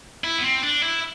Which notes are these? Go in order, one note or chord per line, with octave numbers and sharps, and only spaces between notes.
E4
B3
C4
D4
E4